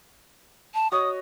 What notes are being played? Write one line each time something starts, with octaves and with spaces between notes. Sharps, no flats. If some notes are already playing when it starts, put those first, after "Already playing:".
A5
F#4 C#5 D#5 D#6